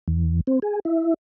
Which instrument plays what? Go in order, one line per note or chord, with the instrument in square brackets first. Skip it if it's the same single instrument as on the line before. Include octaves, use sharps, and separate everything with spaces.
[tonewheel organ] E2
C4
G#4
E4